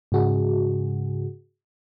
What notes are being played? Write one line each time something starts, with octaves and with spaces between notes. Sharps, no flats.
G#2 C#3 F#4 G#4